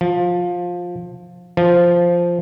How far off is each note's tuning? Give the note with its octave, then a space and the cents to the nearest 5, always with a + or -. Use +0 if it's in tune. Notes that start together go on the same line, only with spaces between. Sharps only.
F3 +15
F3 -5